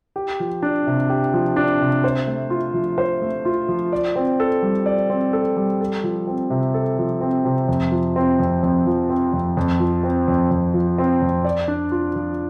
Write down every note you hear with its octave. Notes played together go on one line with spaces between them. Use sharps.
G4
F3
D4
C3
G4
F3
D4
C3
C5
A3
F4
F3
C5
A3
F4
F3
D5
C4
A4
G3
D5
C4
A4
G3
A4
F3
C4
C3
A4
F3
C4
C3
F2
F3
C4
F2
F2
F3
C4
F2
F2
F3
C4
F2
F2
F3
C4
F2
D5
D4
F4
F3